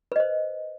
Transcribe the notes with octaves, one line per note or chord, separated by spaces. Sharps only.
B4 C5 D#5